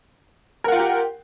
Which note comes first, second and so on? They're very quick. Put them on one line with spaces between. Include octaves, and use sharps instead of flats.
A#4 F#5 F4 G5 G4